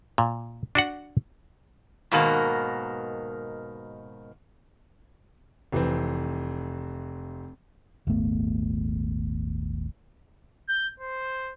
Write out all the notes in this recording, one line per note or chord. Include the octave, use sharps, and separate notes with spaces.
A#2
D4 F#4 F#5
G#2 B2 D#3 A#3
F1 E3 C4
D#1 G#1 A3 B3
G6
C5